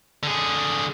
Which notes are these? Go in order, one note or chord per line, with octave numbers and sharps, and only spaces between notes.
D3 G#4